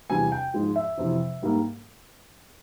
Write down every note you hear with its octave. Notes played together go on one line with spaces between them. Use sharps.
E2 C3 G3 G#5
G5
G#2 F3 G#3
E5
F2 C3 E3
G#2 G3 A#3